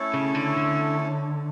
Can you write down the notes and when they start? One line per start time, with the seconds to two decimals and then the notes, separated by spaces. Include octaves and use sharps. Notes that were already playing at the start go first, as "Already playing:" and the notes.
Already playing: A3 C#4 E4 A4 C#5
0.14 C#3
0.35 D3
0.56 D3